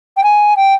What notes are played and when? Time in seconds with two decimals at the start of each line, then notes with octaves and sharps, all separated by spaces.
0.17 G5
0.23 G#5
0.56 G5